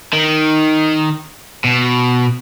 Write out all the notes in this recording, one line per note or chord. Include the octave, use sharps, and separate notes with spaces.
D#3
B2